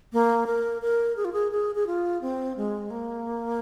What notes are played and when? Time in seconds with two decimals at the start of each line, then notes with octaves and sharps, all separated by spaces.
0.13 A#3
0.47 A#4
0.82 A#4
1.17 G#4
1.25 F4
1.33 G#4
1.52 G#4
1.75 G#4
1.87 F4
2.22 C4
2.57 G#3
2.91 A#3